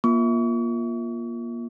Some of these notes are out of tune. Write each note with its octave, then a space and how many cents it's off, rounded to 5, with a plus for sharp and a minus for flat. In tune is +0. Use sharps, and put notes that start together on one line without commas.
A#3 +30 F4 +0 C#6 +40